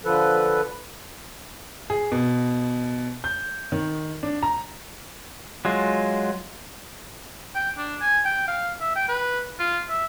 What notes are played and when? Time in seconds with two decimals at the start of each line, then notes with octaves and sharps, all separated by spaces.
0.05 D3 F3 A4 B4
1.90 G#4
2.12 B2
3.24 G6
3.72 D#3
4.23 D4
4.43 A#5
5.65 F#3 G#3 F4
7.55 G5
7.78 D4
8.01 G#5
8.25 G5
8.48 F5
8.81 E5
8.95 G5
9.08 B4
9.59 F4
9.89 E5